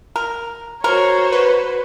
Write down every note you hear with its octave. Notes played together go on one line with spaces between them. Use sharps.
A#4
F#4 A#4 C5 C#5
B4